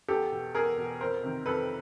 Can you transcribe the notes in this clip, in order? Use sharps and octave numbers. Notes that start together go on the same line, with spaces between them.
E2 G4 A4
B2
E2 G#4 A#4
B2
F2 A#4 C5
C3 D#3
F2 A4 B4